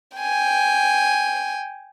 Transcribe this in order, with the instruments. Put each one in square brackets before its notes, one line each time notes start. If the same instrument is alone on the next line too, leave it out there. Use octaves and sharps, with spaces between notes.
[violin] G5 G#5